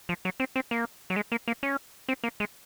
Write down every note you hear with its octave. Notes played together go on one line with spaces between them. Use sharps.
F3
F#3
C4
C4
A#3
F#3
G#3
A#3
A#3
C#4
C4
A#3
G#3